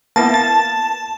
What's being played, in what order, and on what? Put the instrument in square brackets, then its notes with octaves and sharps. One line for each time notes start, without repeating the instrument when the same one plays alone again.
[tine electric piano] A#3 B3 E4 [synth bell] A5
[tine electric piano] A6